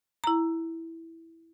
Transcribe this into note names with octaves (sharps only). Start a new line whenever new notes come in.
E4 A#5